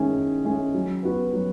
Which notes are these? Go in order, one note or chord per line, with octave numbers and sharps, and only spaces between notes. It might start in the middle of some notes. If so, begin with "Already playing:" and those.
Already playing: D#3 G#3 C#4 E4 G#4
D#3
G#3 C#4 E4 G#4
F#3
B3 F#4 B4
F#3